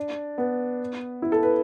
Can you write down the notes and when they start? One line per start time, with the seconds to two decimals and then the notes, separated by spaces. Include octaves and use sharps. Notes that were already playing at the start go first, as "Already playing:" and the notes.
Already playing: D4
0.38 B3
1.22 E4
1.32 A4
1.43 B4